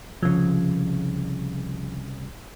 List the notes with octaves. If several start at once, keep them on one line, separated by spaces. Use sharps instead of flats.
C2 C#3 F3